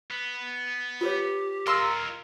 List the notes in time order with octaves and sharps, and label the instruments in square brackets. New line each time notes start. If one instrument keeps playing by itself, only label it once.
[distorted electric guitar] B3
[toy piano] F4 B4 C#5 [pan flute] G4
[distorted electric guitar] F4 D#5 [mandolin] A#4 C6 E6 [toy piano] F5